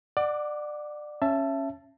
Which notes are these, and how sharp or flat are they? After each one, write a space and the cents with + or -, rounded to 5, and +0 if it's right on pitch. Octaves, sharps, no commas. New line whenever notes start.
D5 +25 F#5 +0 D6 +0
C#4 -10 E5 +20 A5 +0